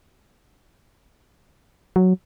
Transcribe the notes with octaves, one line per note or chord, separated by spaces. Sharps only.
F#3